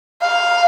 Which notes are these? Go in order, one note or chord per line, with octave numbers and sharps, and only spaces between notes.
F5